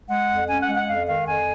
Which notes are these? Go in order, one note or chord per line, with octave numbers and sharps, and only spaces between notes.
G#3 F#5
F2
C#4 G#5
F#5
G#3
F#5
F2 F5
D#3 F5
F2 G#5